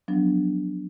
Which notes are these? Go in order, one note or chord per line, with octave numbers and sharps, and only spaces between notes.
F3 F#3 B3 D4